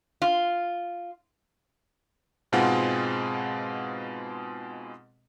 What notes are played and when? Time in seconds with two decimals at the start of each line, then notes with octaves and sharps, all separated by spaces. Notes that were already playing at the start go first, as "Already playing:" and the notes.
0.22 F4
2.52 G#2 B2 G#3 C4 F4 F#5